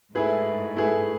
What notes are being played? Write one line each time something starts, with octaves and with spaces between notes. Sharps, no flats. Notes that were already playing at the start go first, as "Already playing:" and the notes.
G#2 A3 E4 G#4 B4
A3 E4 G#4 B4